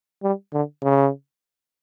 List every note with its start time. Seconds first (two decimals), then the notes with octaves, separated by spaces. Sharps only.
0.23 G3
0.53 D3
0.83 C#3